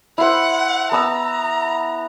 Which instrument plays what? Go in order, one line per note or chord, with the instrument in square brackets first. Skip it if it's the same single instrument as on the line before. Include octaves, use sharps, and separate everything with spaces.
[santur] E4 C5 [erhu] F#5
[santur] B3 A5 E6 [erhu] A#5